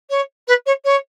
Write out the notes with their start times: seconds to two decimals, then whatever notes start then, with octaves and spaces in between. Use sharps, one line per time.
0.09 C#5
0.47 B4
0.66 C#5
0.84 C#5